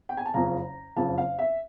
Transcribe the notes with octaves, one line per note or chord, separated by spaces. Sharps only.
G5
G#5
A5
F#1 F2 C#3 A#5
F#1 F2 C#3 A5
F5
E5